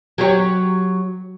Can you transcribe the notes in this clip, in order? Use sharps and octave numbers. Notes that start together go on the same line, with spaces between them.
F#3 G4 C#5